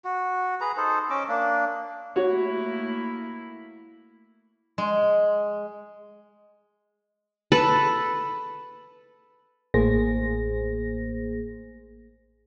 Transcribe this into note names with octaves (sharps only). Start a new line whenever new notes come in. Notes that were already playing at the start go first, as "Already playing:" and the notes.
F#4
G#4 B4 A#5
D#4 A4 C5
C#4 D#5 D6 E6
A#3 D4
A3 A#3 E4 F#4 C#5
G#3
A4 B4
A1 A2 A#3 G#4 C5 A#6